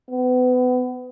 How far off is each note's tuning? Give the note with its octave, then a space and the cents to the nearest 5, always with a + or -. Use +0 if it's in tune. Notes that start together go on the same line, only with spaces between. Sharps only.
B3 +30